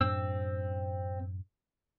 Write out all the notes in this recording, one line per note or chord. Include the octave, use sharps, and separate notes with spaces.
F#2 A2 C4 D4 E6